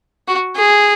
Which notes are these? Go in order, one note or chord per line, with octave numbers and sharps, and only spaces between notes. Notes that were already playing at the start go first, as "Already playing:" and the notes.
F#4
G#4